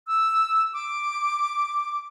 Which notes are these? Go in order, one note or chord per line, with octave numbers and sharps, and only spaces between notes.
E6
D6